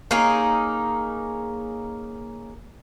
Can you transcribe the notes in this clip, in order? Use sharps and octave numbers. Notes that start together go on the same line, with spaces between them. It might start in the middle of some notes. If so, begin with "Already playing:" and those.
A#3 C#4 D#4 G#4